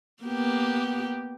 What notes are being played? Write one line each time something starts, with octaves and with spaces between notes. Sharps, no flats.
A#3 B3 G4